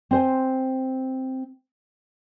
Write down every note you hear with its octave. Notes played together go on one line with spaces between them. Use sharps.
C4 C5 G#5